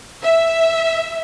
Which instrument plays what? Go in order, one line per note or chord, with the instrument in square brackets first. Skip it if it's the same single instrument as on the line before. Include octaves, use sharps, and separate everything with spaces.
[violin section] E5